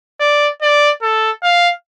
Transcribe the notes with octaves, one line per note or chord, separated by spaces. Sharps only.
D5
D5
A4
F5